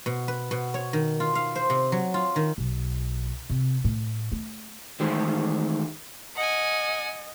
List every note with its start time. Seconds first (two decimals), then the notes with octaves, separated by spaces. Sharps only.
0.06 B2
0.28 B4
0.51 B2
0.74 C#5
0.93 D#3
1.20 F4
1.35 F5
1.55 C5
1.70 C3
1.92 F#3
2.14 F4
2.36 D#3
2.58 B1
3.50 C3
3.84 A2
4.32 A3
5.00 D#3 E3 G#3 A3 G4 C5
6.36 D#5 F#5 G#5